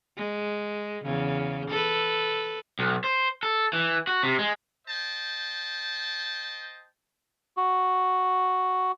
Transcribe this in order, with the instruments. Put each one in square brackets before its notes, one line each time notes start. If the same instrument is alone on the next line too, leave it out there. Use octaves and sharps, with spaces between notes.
[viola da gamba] G#3
E2 C#3
A4 B4
[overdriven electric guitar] B1
C5
A4
E3
F#4
C3
G#3
[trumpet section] C5 D#5 G5 A5
[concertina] F#4